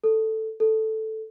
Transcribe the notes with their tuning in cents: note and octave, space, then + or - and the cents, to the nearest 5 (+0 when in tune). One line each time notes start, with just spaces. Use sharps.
A4 +5
A4 +0